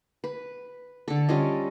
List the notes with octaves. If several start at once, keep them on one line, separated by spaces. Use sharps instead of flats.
B4
D3 A4
G3 C#4 F4 D#5